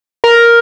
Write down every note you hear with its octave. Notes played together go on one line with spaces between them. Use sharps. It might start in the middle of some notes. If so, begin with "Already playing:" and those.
A#4